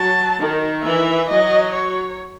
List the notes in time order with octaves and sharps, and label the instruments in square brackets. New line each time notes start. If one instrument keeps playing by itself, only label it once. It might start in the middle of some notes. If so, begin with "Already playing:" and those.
Already playing: [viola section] F#3 [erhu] A5
[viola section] D#3
[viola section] E3 [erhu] E5
[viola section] F#3 [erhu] D#5
[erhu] C#5